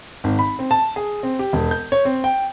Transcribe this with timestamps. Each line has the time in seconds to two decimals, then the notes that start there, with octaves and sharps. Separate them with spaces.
0.24 G#1
0.39 B5
0.59 C4
0.71 A5
0.96 G#4
1.23 C4
1.39 G4
1.53 E1
1.71 G6
1.92 C#5
2.05 C4
2.24 G5